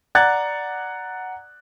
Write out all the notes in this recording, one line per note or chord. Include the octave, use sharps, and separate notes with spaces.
D5 F#5 A#5 F#6 G#6 A6